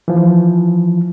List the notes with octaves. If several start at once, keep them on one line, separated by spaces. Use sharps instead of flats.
E3 F3